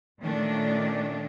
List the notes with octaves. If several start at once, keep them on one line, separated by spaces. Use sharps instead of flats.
A#2 D#3 A3 C#4 D4